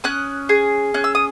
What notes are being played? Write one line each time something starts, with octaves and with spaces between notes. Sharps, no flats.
C#4 D#6 F#6
G#4
C#4 F#6
E6
D#6